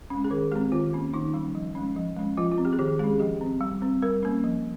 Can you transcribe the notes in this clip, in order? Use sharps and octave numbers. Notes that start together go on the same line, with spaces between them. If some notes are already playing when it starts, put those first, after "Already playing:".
G#3 C#4
G#4
D#3 A#4
G#3 C4 G4
D#3 F4
A#3 C#4
D#3 D#4
G3 C#4
F3
G#3 C#4
F3
G#3 C#4
F3 F4
F4
C4
G4
G#4
D#3 G4
G#3 C#4 G#4
F3 G4
C4
G3
C4
G3 A#4
A#3 C#4
F3